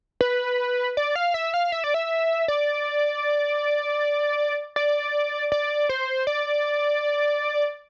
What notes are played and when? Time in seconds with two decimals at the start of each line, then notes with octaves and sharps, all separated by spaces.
0.21 B4
0.97 D5
1.15 F5
1.34 E5
1.54 F5
1.72 E5
1.84 D5
1.94 E5
2.48 D5
4.76 D5
5.52 D5
5.89 C5
6.27 D5